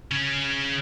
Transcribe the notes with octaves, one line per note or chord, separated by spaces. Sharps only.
C#3 C#4